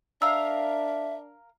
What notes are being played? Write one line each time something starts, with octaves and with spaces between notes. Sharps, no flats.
D4 A#4 E5 F5 E6